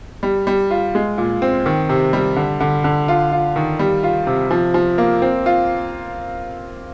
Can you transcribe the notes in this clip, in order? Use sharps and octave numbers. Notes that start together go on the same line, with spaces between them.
G3
G3
F4
G#3
A#2
C4
D#3
C3
G3
D3
D3
D3
F4
F4
D#3
G3
F4
C3
F3
F3
A#3
C4
F4